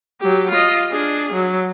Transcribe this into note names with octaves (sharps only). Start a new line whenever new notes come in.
F#3 G4
F4 D#5
D4 G#4
F#3